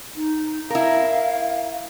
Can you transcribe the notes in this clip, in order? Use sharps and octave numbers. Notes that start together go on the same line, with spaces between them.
D#4
E4 A#4 F5